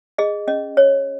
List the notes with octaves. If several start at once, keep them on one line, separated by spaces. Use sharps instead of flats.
G#4 D#5
C#4 D#5
C#5